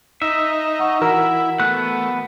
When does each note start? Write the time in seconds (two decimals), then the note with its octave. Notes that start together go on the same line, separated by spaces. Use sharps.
0.22 D#4 E5
0.79 F#5 C#6
1.01 E3 E4 F#4 A#4 F#5 E6 E7
1.60 A3 B3 F#6